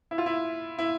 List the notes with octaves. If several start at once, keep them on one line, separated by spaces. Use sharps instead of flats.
E4
F4
E4
E4